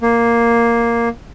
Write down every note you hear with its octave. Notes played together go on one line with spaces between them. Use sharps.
A#3